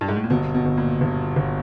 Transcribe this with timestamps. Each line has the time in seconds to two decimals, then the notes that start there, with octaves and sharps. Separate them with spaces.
0.01 G2
0.08 G#2
0.16 A2
0.24 A#2
0.30 G1 B2
0.54 B2
0.65 G1
0.77 A#2
1.01 G1
1.36 G1